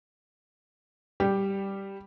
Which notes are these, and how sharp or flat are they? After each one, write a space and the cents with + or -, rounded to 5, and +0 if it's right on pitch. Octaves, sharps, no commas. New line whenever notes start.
G3 +0 G4 +0